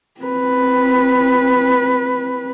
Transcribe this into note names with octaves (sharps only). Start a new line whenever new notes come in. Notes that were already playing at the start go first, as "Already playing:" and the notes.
C4 B4